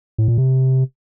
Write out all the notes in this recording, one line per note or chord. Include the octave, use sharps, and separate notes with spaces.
A2
A#2
C3